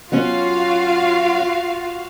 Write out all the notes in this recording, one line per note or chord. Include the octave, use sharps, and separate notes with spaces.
F#3 C#4 F4 F#4 F5